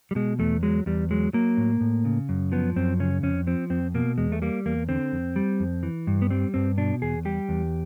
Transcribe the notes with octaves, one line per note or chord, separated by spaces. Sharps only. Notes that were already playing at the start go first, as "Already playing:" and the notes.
G3
B2 G#3
E2 A3
F#3 G#3
E2 G3
F#3 G#3
F#3 A#3
A2
A2
C#3
F#2
F3 B3
F#2 C4
C#3 C#4
F2 C#4
F3 C4
F2 C4
B2 A#3
E2 G#3
A3
G3 A#3
E2 A#3
D3 C4
F2
G3
F2
E3
G2
B3
G3 C4
G2 C4
B2 D4
E2 G#4
G3 G4
E2